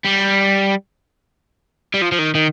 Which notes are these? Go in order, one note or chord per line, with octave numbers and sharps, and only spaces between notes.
G3
G3
F3
F3
D#3
D#3